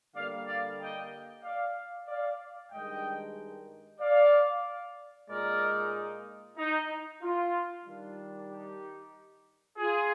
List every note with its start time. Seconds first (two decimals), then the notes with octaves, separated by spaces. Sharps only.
0.14 D3 G3 A#3 D5 F5
0.47 D5 F5
0.79 D#5 G5
1.43 D5 F5
2.07 D5 F5
2.71 G2 D#3 G#3 D4 D#5 G5
4.00 D5 F5
5.28 A#2 G#3 D#4 A#4 D5
6.58 D#4
7.22 F4
7.85 D#3 G3 D4
8.50 D#4 G4
9.78 F4 G#4